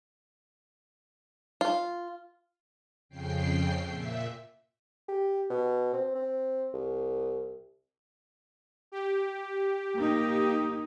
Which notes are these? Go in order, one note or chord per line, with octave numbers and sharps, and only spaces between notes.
F4
F2 C#3 G5 C7
A#2 E5
G4
B2
C4
C4
C2
G4
A#3 D#4